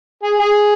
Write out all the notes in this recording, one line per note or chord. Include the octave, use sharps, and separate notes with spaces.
G#4
G#4